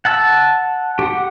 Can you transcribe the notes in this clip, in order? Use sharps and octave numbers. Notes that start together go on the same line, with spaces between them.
F#5 A5 E6
G4 F#5